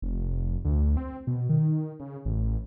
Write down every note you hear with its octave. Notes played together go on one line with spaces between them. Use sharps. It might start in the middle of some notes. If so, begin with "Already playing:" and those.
F1
D2
C4
B2
D#3
C#3
A1